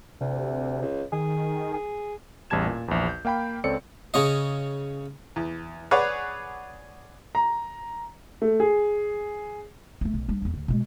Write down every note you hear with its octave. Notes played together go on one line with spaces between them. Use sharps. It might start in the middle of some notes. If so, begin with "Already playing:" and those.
D2 C3
C#2
D#3 G#4
G#4
A1 E2 G3 A5 G#6 E7
A#2
A#1 E2
G6
A#3 F5 G5 B5 G6
C#2 C4 A4 C#5 D5 C#7
C#3 C#4 D#5
E2
G#4 B4 C#5 D5 F#5
A#5
A3
G#4
G3 A3
B1
G3 D4
A1 E2
D2
B2 G#3